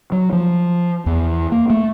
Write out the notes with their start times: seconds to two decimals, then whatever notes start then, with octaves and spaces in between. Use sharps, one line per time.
0.12 F#3
0.32 F3
1.06 E2
1.52 A#3
1.70 A3